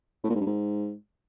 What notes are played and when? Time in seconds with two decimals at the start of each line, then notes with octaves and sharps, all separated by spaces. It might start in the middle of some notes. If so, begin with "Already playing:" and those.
0.24 A2
0.29 A#2
0.35 G#2
0.40 G2
0.46 G#2